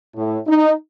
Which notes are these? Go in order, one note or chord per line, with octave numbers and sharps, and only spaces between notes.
A2
D#4